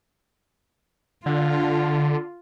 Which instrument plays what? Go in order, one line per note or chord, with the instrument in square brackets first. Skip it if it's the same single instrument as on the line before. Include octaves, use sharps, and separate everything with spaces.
[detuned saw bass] D3 [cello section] F4